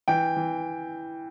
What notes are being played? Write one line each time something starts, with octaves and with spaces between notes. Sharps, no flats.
E3 G5
E3